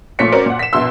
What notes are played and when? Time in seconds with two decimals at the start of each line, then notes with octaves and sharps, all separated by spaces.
0.19 A#2 F3 A3 C#5 B6 C#7
0.32 C4 C#4 F#4 A#4 C5 D5
0.46 A#2 F#5
0.59 B6 E7
0.73 A#1 B2 E5 C6 E6